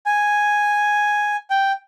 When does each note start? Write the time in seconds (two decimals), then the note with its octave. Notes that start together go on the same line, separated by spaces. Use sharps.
0.06 G#5
1.50 G5